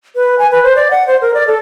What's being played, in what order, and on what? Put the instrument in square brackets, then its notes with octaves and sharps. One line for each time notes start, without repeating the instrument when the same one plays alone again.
[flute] B4
G#5
B4
C5
D5
F#5
C5
A#4
D5
A4